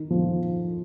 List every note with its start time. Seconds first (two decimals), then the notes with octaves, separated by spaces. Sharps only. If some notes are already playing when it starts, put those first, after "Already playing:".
Already playing: D#3
0.10 F3